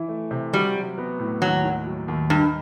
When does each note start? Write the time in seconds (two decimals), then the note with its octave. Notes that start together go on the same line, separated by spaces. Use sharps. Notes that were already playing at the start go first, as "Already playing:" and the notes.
Already playing: E3 E4
0.09 A3
0.31 C3
0.53 G3 F#4
0.75 F#3
0.98 B3
1.19 A2
1.41 D#2 F#3
1.64 D#3
1.86 F#3
2.08 D#2
2.30 G2 D#4